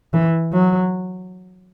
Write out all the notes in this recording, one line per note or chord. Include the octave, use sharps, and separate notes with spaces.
E3
F#3